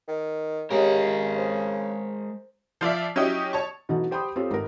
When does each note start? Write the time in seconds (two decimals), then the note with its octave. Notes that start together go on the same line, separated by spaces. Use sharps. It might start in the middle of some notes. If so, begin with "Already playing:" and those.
0.08 D#3
0.71 C#3 G#3 G4 A#4 C#5 D#5
1.38 C5
2.81 F3 F4 D5 E5
3.16 F#3 C#4 E4 G4 D#5
3.53 C#5 A5 C#6
3.89 B2 D3 E3 F#3 D#4 F#4
4.11 G4 C5 G5 B5 C6 D#6
4.36 C4 F4 G4 A4 C5 C#5
4.50 G#1 A#4